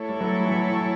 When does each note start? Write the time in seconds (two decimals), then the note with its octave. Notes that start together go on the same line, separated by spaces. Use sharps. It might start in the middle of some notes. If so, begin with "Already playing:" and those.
Already playing: A3 E4 A4 C#5
0.09 G3
0.21 F#3
0.45 E3
0.51 F#3